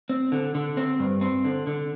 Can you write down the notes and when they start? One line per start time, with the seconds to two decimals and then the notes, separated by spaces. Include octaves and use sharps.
0.09 C4
0.32 D3
0.55 D3
0.77 C4
0.99 G2
1.21 C4
1.45 D3
1.67 D3